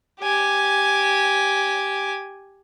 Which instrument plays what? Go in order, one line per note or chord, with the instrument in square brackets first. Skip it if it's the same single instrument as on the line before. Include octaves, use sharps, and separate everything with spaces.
[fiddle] G4 G#5